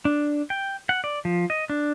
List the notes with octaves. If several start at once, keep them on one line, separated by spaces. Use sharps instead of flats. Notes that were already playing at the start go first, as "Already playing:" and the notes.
D4
G5
F#5
D5
F3
D#5
D4